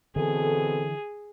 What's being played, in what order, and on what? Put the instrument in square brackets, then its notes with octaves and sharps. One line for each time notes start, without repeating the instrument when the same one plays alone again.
[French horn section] B2 C4 A4 [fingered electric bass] D3 E3 [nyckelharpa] G#4